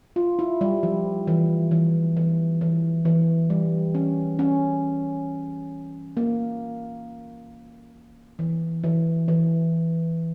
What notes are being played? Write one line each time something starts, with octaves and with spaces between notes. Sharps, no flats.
F4
E4
G3
F3
E3
E3
E3
E3
E3
G3
C#4
C#4
A#3
E3
E3
E3